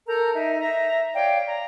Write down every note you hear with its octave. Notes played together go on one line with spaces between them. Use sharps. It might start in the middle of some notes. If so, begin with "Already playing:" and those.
A4 A#4 A#5 G6
D#4 E5
E5 A#5
C#5 D5 F5 G5
A#5